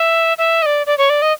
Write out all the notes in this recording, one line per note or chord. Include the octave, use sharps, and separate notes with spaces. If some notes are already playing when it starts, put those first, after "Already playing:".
Already playing: E5
E5
D#5
D5
D5
C#5
D5
D#5